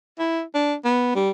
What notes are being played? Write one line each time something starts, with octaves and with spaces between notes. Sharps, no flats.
E4
D4
B3
G3